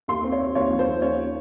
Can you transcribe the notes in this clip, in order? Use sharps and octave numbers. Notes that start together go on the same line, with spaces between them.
D#2 C6
C4
C#5
C4
D#2 C#5
F3
C5
D#2
C#4 C#5